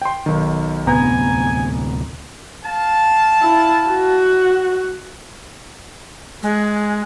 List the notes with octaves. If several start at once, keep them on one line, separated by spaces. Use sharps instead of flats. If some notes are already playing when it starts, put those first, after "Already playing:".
G5 C6
B1 D#3
D2 A2 C3 B3 G#5 A#5
F5 A5
E4
F#4
G#3